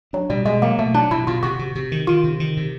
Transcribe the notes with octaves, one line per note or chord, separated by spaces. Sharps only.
F#3 D4
B2 G3
B2 G#3
F#3 A#3
B2 A3
F#3 D4
B2 E4
B2 F4
C3 F#4
C3
C3
D#3
D#3 F4
C3
D#3
C3